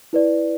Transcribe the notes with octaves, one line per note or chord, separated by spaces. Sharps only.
E4 B4 D5